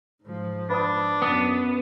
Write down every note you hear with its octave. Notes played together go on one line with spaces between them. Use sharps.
G#2 F3
D4 B4 D#6
F#2 B3 D#6